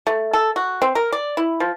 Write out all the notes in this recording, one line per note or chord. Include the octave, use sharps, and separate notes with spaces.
A3
A4
F#4
C4
A#4
D5
E4
F3